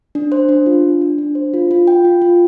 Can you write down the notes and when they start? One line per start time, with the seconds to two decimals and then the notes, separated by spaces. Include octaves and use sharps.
0.15 D4
0.32 C5
0.49 D4
0.66 F4
0.84 D4
1.01 D4
1.18 D4
1.35 C5
1.54 F4
1.71 F4
1.87 G5
2.05 F4
2.22 F4